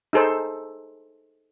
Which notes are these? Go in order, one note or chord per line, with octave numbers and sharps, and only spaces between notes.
D#4 G#4 A4 C5